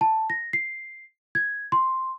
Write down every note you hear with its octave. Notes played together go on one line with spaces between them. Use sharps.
A5
A#6
C7
G#6
C6